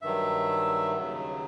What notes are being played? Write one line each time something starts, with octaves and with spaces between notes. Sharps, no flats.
G2 D#3 F#3 E5
D#2 C#3 F#3